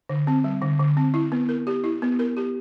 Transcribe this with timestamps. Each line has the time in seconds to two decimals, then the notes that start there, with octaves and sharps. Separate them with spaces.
0.09 D3
0.27 C4
0.44 G3
0.62 D3
0.79 D3
0.97 C4
1.14 E4
1.32 B3
1.49 A#4
1.67 G4
1.84 E4
2.02 B3
2.19 A#4
2.37 G4